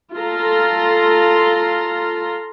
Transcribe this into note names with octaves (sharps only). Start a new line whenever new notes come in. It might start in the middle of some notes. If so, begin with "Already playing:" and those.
F4 A4 A#5 C6